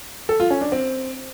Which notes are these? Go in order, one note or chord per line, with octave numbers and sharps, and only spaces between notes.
A4
F4
C#4
D4
C4